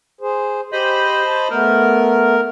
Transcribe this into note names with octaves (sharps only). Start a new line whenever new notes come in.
G#4 C5
G4 C5 D#5 B5
A5
A3 B3 A#4